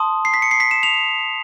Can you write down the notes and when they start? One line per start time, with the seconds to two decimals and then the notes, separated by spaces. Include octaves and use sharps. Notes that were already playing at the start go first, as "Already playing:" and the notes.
Already playing: A5 C6 D#6
0.25 C7
0.34 B6
0.42 C#7
0.51 C7
0.60 B6
0.71 E7
0.83 F7